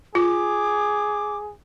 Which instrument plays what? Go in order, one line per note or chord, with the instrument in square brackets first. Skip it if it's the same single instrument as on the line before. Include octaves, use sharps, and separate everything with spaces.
[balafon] F4 [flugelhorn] G#4 [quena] D6